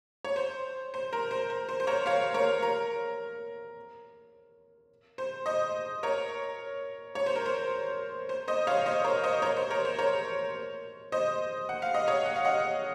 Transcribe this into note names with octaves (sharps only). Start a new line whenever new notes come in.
C#5
C5
C5
A#4
C5
A#4
C5
C5
A#4 C#5
C#5 F5
A#4 C#5
A#4
C5
C5 D#5
A#4 C#5
C#5
C5
A#4
C5
C5
C5 D#5
C#5 F5
C5 D#5
A#4 C#5
C5 D#5
A#4 C#5
C5
A#4 C#5
C5
A#4 C#5
C5 D#5
F#5
F5
D#5
C#5 F5
F#5
F5
D#5 F#5